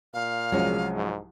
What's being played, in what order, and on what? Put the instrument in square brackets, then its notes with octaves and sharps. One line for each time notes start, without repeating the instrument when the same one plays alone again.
[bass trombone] A#2 [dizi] F5
[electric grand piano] C2 F3 F#3 [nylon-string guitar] G#3 C#4
[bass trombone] G#2